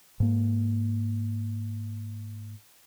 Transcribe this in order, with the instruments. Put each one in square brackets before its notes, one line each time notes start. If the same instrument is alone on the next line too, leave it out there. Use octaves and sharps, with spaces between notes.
[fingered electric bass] G#2 A#3